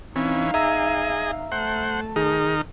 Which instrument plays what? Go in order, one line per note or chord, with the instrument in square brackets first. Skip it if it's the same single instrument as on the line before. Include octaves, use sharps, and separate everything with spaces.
[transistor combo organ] E3 C#4 [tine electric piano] C4 [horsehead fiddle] D#4 F5
[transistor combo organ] G#4 D#5 [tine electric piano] E5 A#5 E6
[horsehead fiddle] A3 A5 [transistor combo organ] C5 F#5
[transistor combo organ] D#3 D#4 F6 [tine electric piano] G#4